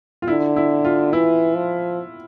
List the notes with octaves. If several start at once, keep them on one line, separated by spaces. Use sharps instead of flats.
F4
D3 E4
E4
F4
E3 E4
F3